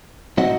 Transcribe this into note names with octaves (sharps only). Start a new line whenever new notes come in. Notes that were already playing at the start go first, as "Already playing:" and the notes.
A2 F#3 C4 D#4 D#5 F#5